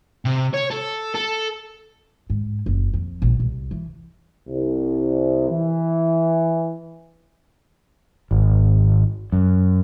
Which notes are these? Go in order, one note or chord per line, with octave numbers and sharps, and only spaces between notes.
C3
C#5
A4
A4
G#2
F#1
F2
A#1
C2
E3
C2
E3
G#1
F#2